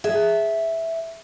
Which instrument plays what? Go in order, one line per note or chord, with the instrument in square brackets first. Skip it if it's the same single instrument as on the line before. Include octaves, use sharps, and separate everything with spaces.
[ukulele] G#4 [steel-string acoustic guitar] E5